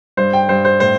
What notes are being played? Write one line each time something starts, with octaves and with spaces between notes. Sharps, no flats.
G2 C5
G5
G2 C5
C5
A2 C5